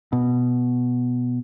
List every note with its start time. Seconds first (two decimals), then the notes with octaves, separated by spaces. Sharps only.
0.13 B2